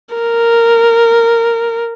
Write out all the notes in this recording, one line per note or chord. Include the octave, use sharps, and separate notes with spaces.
A#4